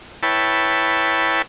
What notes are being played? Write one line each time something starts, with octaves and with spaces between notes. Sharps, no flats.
E4 B4 C#5 G5 A5